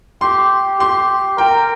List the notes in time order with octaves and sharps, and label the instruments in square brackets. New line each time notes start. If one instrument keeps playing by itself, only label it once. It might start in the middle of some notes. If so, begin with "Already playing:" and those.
[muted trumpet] G4 [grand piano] C6
[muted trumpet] G4 [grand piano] C6
[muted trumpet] A#4 [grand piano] G5